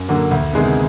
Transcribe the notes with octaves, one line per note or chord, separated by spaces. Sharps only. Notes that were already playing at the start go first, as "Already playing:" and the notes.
Already playing: F#2
D3 F#3 A#3
D2
C3 D#3 G#3 B3